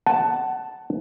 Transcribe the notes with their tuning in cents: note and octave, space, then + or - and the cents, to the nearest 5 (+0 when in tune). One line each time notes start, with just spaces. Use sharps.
F#5 +25 A5 +0